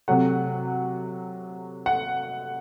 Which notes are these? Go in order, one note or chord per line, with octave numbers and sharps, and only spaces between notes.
C3 F#3 A3 F#5
F#5